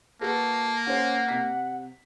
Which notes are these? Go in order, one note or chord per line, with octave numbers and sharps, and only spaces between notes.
A#3 F#4 A4 B4 A5
C#4 C5 F#5
C3 B6